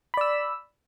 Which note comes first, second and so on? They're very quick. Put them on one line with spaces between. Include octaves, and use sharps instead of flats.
B5 D5 E6